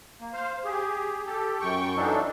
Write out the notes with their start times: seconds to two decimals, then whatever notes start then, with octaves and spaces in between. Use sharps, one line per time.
0.21 A#3
0.33 C5 F5
0.65 G4 G#4
1.26 G4 A4
1.61 F#2 G5 C#6
1.96 E3 F#3 D4 D#4 A4